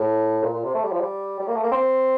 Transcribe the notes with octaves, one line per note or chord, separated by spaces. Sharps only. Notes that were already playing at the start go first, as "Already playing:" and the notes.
Already playing: A2
A#2
A#2
C3
A3
G3
F3
G3
G3
A#3
A3
A#3
C4